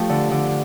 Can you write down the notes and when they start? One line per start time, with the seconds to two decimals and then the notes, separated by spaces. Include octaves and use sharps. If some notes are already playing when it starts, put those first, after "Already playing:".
Already playing: F3 A3 G4
0.09 D3
0.31 D3